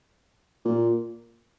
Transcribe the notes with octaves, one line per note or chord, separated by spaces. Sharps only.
A#2